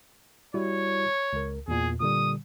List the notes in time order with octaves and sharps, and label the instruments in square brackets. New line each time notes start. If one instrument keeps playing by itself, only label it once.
[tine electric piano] G3 E4 F#4 [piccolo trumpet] C#5
[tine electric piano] C#2 A#4
[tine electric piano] E2 A#2 [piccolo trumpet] G#4
[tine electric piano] A#2 D3 G3 [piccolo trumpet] D#6